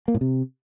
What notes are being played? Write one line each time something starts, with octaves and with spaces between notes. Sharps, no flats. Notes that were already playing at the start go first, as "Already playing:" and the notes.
A#3
A2
C3